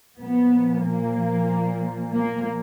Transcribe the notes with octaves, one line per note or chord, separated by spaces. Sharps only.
A#2 F3 B3
A#3
A#3